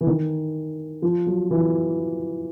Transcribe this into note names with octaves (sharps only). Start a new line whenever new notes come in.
E3
D#3
F3
F#3
E3